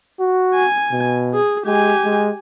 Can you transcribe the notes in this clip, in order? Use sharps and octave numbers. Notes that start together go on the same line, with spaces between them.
F#4
G#5
B2
G#4
G#3 G4 G#5
G#3